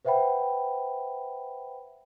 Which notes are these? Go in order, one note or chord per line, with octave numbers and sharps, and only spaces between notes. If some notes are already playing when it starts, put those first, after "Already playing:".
B4 C5 E5 F#5 G5 B5